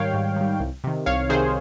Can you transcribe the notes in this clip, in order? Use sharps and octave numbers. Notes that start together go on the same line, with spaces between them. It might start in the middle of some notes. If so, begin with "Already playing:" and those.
Already playing: G#2 D#3 G3 C#5 F5 G5
G#2
D#3 G3
C2
C3 D#3
C2 C#5 F5
C3 D#3 G#4 C5